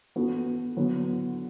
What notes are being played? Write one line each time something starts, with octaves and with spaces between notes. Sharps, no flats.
E3 B3 F#4 A4
D3 F#3 B3 E4